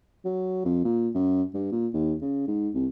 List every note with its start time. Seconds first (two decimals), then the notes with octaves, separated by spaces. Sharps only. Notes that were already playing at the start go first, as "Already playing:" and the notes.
0.25 F#3
0.65 F2
0.84 A#2
1.14 F#2
1.54 G2
1.72 A#2
1.93 D#2
2.21 C#3
2.47 G#2
2.74 C2